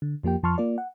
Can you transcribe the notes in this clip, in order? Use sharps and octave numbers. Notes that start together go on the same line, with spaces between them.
D3
F2 F3 A#3 G4 G5
F2 F3 A5 C6 C#6 F6
A#3 F4 D5
F#5